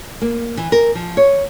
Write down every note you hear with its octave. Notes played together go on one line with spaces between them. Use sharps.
A#3
E3
A#4
F3
C#5